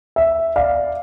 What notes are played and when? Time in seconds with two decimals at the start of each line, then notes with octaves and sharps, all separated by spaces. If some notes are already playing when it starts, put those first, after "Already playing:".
0.16 E5
0.56 D5 F5